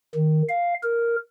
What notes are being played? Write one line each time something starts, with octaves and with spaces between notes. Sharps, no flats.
D#3
F5
A#4